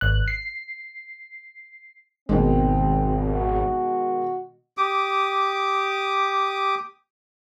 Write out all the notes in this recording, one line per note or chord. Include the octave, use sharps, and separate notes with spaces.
G#1 F#6
C7
G#1 B2 D#3 G#3 C4
F#4
G4 D6 D#6